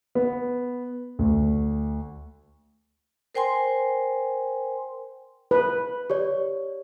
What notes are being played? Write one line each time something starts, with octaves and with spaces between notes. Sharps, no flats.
B3
D2
A#4 C5 G5 G#5 C6
B4
G4 C#5 D5